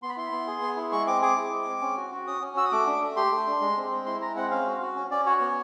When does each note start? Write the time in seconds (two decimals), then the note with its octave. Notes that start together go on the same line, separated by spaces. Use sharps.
0.03 B3 C6
0.09 B5
0.17 E4 C6
0.32 B3
0.47 G#4
0.62 B3
0.77 E4
0.92 G#3 C#6
1.07 C4 D6
1.21 G#4 D6
1.37 E4
1.52 G#3
1.67 C4
1.81 C#4
1.97 F#4
2.11 F#4
2.27 C#4 D#6
2.41 C#4
2.57 F#4 E6
2.65 D#6
2.72 A3 D6
2.86 D4
3.01 A3
3.16 G4 C6
3.31 A3
3.47 D4
3.61 G#3
3.77 C4
3.91 G#3
4.06 E4 C6
4.21 G#3 A#5
4.36 C4 F#5
4.51 C#4 F5
4.67 F#4
4.81 F#4
4.96 C#4
5.11 C#4 D5
5.26 F#4 C#5
5.41 B3